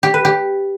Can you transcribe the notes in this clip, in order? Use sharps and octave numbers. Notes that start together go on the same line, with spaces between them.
G4
B4
G4